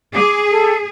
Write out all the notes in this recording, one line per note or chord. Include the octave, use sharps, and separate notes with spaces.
G#4 D6
A4